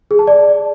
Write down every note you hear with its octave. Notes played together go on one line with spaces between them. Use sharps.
G#4
A5
D5